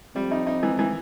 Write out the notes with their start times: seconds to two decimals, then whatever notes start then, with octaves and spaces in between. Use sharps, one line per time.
0.15 F2 G3
0.31 D#4
0.47 D#4
0.63 E3
0.79 E3